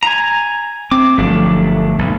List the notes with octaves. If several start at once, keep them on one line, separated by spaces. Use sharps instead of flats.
G#5 A#5
C4 D6
G1 F3 F#3 A3 D4
B1